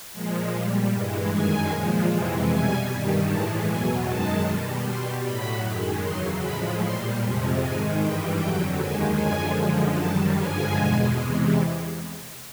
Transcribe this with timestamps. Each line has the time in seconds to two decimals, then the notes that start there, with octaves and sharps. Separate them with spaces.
0.13 A#2 F3 G#3
0.52 A#2 G3
0.92 G2 E3 G#3
1.30 F#2 D#3 G#3 G#5
1.70 A#2 F3 G#3
2.09 F2 C3 E3 G#3
2.49 B2 G3 G#5
2.88 G2 D#3 G3
3.27 A2 E3 G#3 A5
3.66 E2 B2 F#3 G#5
4.06 F#2 D#3 G#3 A5
4.46 B2 G3
4.85 B2 G3 C6
5.24 A2 F#3 B5
5.64 F#2 D#3 G#3
6.03 E2 C#3 F#3 C6
6.42 A2 F3 G#3 B5
6.83 A#2 G3 C6
7.21 F2 C3 F3 G#3
7.60 G#2 D#3 G#3 G#5
8.00 G2 E3 G3 G5
8.39 F2 D3 F#3 G5
8.79 D#2 D#3 G#3 G#5
9.18 F#2 D3 F3 G#3 G#5
9.57 F#2 D3 F3 G#3
9.98 F#2 D#3 G3 A5
10.36 G2 D3 F3 G#3 G#5
10.75 E2 B2 G#3
11.15 E2 C3 E3 G#3